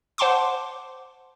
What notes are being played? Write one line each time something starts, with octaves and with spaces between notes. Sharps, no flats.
C5 F#5 A5 C6 D6